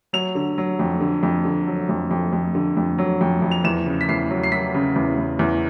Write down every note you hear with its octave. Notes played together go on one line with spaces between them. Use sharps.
F#3 F7
D3
F#3
F2
D3
F2
D3
F#3
F2
F2
F2
D3
F2
F#3
F2
F2
F7
E2 E7
C#3
B6
E2 C7
F#3
C7
F#3 B6
C#3
E2
E2
E2